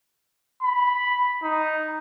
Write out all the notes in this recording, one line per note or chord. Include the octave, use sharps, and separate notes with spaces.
B5
D#4